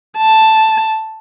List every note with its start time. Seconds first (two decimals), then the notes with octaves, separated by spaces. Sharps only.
0.17 A5